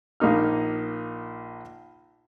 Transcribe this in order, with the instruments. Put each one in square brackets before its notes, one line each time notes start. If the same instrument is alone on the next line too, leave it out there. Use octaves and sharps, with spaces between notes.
[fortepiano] A#1 A#3 D#4 F6